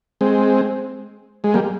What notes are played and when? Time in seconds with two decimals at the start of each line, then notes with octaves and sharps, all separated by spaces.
0.21 G#3 C4
1.44 G#3
1.54 G3 A#3